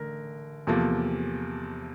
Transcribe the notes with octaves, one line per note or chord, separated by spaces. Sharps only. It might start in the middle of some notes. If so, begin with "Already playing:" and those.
Already playing: A1 D3 A#4
E2 C3 F3 A#3 A4